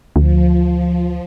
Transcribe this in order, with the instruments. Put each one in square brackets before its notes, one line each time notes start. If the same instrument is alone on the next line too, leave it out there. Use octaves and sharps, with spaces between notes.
[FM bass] D2 [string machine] F3